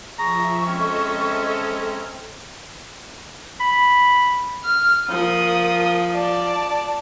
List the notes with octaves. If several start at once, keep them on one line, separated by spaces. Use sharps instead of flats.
F3 G#4 E5 A#5 C#6
G#3 C4 C#4 A4 D#5 E5 A#5
B5
F6
F3 A#3 D#6
D5 A5